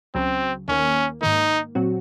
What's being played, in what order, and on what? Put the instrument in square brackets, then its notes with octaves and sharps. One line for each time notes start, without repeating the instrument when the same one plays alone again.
[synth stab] C#2 C#3 F#3 [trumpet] C4
[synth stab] D#2 D#3 A#3 [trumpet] C#4
[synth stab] G#2 D#3 A#3 [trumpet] D#4
[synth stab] A#2 F#3 C4 F#4